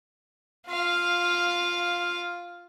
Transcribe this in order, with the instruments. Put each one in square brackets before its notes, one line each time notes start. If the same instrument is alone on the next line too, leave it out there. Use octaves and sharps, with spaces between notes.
[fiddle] F4 F5